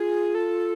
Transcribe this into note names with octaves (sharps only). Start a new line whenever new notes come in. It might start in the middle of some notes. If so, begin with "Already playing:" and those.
Already playing: F4 G#4
A4